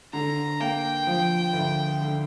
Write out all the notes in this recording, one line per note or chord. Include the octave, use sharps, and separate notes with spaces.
D3 A#5
A#3 G5
F3
D2
D3